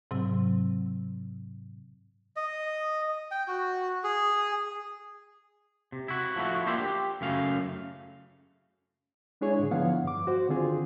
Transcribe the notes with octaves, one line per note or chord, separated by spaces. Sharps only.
G#2 C3 F#3 C4 E6
D#5
G5
F#4
G#4
C3
E4 F#4
F3 A3 E4 F#4
A#3 D4 F4 G4 C5 E5
G4
F#2 C#3 A3 F5
G#3 D4 E4 G#4 C#5
G#2 D3
D3 F3 B3 E4 F5 F#5
G2 D6
F#4 C5
D3 D#3 C4 F4 G#4